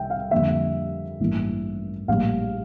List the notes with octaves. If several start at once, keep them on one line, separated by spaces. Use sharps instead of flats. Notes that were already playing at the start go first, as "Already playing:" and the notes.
Already playing: C2 C3 E5 G5
F5
F2 D3 G3 A#3 E5
A1 G2 E3 A#3
A#1 A2 G3 A#3 F5